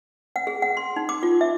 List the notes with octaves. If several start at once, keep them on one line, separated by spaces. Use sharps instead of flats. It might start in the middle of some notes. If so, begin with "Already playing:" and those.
F#5
G#4
F#5
C6
D#4
D6
F4
E5